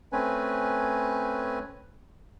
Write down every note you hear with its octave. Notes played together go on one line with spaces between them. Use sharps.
A3 C4 C#4 B4 G#5